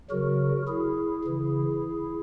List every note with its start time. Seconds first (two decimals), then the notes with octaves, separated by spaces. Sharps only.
0.10 C#3 F#3 F#4 A#4
0.67 E4 G#4
1.24 C#3 E3